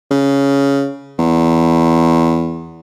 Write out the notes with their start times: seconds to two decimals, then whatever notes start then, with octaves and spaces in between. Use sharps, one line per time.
0.11 C#3
1.19 E2